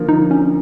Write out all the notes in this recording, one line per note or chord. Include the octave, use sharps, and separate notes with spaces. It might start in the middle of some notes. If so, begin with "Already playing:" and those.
Already playing: D3 F3 A#3
D#4
C#4